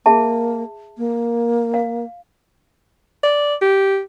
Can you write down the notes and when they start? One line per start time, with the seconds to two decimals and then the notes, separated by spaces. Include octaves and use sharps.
0.06 A#3 G#4 E5 A5
0.98 A#3
1.74 F5
3.23 D5
3.61 G4